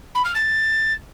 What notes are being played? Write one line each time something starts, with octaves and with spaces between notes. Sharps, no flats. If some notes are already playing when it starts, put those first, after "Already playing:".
B5
F6
A6